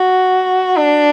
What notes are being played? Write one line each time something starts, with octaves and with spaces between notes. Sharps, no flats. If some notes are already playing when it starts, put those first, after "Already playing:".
Already playing: F#4
D4